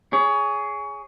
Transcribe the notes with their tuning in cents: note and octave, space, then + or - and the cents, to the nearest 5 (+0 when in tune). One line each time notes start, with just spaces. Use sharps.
G#4 +0 C#5 +25